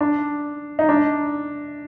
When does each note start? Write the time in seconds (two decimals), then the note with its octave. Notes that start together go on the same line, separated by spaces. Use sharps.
0.01 D4
0.79 D#4
0.89 D4